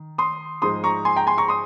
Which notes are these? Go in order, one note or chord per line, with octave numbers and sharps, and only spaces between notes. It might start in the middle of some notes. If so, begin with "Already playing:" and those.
Already playing: D#3
C6 D#6
G#2 F3 G#3 C6 D#6
A#5 C#6
G#5 C6
G5 A#5
G#5 C6
A#5 C#6
C6 D#6